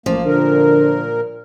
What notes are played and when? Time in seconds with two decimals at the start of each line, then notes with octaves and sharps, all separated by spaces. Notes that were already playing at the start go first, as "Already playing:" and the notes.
0.06 A1 F3 A#3
0.25 A#2 D3 A#4